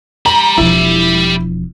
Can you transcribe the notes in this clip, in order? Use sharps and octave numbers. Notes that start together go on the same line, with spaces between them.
G4 A#5 B5
E1 F3 E4